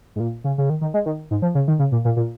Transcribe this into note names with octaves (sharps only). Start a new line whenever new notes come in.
G#2
A#2
C#3
C#3
D#3
D#3
G#3
D#3
G#2
F3
C#3
D#3
C#3
A#2
A#2
A#2